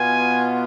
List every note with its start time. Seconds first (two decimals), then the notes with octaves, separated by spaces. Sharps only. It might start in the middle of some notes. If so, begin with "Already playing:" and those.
Already playing: B2 B3 F4 G#5